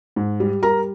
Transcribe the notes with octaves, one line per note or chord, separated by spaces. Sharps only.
G#2
G3
G3 A#4 A#5